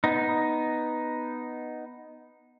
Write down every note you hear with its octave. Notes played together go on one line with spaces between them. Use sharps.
B3 D#4